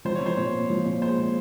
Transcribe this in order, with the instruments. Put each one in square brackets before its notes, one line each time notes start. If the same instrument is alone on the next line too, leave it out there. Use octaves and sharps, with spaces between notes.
[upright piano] F3 [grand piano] C5
[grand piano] C#5
[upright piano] F3 [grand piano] C5
[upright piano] A#2 [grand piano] C#5
[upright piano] A#2
F3
A#2
[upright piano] G#3 [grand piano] C5
[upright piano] A#2